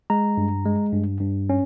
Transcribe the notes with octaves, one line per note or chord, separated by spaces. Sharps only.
G#3 A#5
G2
G#3
G2
G2
C#4